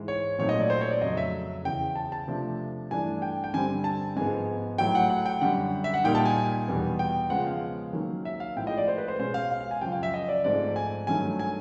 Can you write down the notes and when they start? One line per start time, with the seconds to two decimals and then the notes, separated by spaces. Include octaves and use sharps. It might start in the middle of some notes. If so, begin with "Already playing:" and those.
Already playing: G#2 E3 G#3
0.08 C#5
0.38 A#2 F#3 A3 C4 D#4 C#5
0.49 D#5
0.61 D5
0.70 C5
0.81 C#5
0.91 D5
1.01 F2 C#3 F#3 A3 D#5
1.17 E5
1.64 E2 C#3 E3 G5
1.96 A5
2.12 A5
2.28 C3 F3 A3 D4
2.91 G2 E3 A3 D4 G#5
3.22 G5
3.44 G5
3.53 G2 D3 G3 C4 G#5
3.84 A5
4.16 G#2 F3 G#3 B3 G#5
4.78 A2 F#3 A3 G5
4.95 F#5
5.10 F#5
5.26 G5
5.41 F#2 D3 G3 F#5
5.84 E5
5.94 F#5
6.04 A#2 G3 A#3 D#4 G5
6.15 A5
6.25 G#5
6.37 G#5
6.68 E2 B2 G3 B3
6.99 G5
7.30 C#3 F3 G#3 B3 F#5
7.47 F5
7.93 D#3 F#3 A#3 C#4
8.25 E5
8.40 F5
8.56 A2 F3 G#3 G5
8.67 D#5
8.77 D5
8.88 C5
8.98 B4
9.08 C5
9.20 B2 G#3 C#4 C5
9.34 F5
9.50 F5
9.60 F5
9.71 G#5
9.81 F#2 C#3 F3 G5
9.92 F5
10.03 E5
10.14 D#5
10.29 D5
10.44 G#2 F3 A3 C4 D5
10.76 G#5
11.07 G2 D#3 F#3 A3 C#4 G#5
11.39 G#5